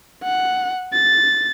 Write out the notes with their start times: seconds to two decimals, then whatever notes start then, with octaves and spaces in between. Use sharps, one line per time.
0.23 F#5
0.93 A6